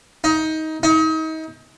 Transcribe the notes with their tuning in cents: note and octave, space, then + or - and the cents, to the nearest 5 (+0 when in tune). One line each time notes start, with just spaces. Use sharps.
D#4 +20
D#4 +35